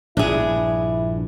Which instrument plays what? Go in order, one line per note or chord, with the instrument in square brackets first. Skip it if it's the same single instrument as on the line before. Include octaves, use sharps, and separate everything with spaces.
[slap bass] A#1 G2 [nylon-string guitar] D4 G#4 [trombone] E4